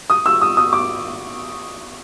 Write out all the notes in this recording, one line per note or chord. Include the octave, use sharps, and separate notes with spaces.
D#6
E6
D#6
D#6
D6